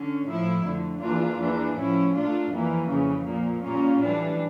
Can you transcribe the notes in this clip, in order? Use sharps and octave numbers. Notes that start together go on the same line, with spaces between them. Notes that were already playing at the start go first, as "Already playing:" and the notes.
Already playing: D3 C#4
A2 F3 A3 E4
F2 D3 A3
E2 E3 A#3 D4 F4
E2 E3 A#3 D4
A2 F3 C#4 E4
A#2 A3 D4 F4
F2 E3 G3 A#3
F2 C#3 E3
A#2 F3 A#3
A#2 G3 A#3 C#4 F4
A2 E3 G3 D4